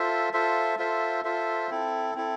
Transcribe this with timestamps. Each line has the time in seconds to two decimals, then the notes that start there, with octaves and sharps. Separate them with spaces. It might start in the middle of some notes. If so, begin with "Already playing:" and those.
Already playing: F4 A4 C5 E5
0.33 F4 A4 C5 E5
0.78 F4 A4 C5 E5
1.24 F4 A4 C5 E5
1.70 C4 E4 A4
2.15 C4 E4 A4